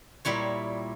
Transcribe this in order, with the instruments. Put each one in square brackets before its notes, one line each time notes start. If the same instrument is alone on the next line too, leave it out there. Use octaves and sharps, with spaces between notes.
[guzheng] A#2 G3 E4 C#5